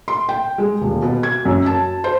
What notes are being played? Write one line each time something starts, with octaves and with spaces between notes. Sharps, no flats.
C6
G5
G#3
D#1
B2
G#6
F#2
A5
C5